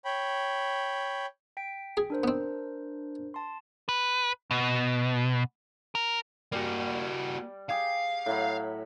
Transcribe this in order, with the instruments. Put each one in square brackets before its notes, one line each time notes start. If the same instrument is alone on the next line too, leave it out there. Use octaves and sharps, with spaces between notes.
[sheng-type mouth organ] C#5 G5 B5
[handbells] G5 B6 D7
[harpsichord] G#4
[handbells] D4 A#4 C5
[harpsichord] B3 C4
[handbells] A5 C6
[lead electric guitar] B4
B2
A#4
[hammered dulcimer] G3 [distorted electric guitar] A#3 F#4
[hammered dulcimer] G4 G#4 [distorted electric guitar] F5
[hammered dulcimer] A2 F#3 B5